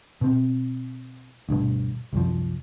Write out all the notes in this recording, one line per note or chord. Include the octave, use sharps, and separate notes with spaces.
B2 C4
D2 G2 B2
C2 F#2 F3